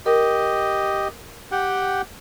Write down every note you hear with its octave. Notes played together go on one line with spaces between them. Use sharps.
G4 A#4 D#5
G4 F#5 G5